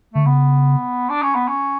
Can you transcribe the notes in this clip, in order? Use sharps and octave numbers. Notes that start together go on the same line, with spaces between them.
D3 A3
C#3 B3
D4
C#4
B3
C#4